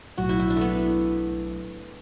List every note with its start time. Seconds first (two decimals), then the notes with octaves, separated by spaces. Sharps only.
0.18 B1 A2 F#3 F#4
0.29 E4
0.39 E4
0.50 D4
0.56 A3 B3